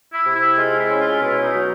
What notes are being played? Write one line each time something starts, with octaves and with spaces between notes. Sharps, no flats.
E4
C3
E4
G#3 F4
E4
C#4
F4
B2 E4
D#4
F#3